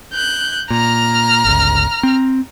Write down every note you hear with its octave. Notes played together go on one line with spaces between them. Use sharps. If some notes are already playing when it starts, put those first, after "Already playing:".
F#6 G6
A#2 A#5 F6
G1 C#2
C4